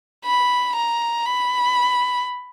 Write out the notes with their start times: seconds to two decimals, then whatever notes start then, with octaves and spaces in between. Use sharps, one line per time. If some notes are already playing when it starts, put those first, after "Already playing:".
0.25 B5
0.75 A#5
1.26 B5